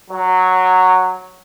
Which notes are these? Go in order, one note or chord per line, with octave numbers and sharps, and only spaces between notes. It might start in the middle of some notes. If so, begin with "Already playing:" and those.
F#3